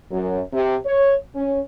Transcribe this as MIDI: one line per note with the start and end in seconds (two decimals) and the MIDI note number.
0.11 0.42 42
0.53 0.76 48
0.86 1.15 73
1.34 1.60 61